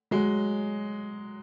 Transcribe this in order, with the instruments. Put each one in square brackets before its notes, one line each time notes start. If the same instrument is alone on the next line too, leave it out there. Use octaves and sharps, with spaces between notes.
[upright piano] F#3 G#3